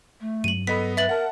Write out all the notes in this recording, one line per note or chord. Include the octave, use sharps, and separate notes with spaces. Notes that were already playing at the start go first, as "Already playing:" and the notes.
A3
G2 F#3 D#7 F#7
B3 A4 D#5 B5 B6
B4 E5 A6 F#7
A#4 F#5 A5